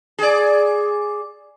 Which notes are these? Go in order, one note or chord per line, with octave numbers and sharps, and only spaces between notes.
G#4 D5